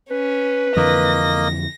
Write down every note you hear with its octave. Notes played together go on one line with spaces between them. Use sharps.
C#4 B4
F2 D3 E3 A#3 D#5 A#6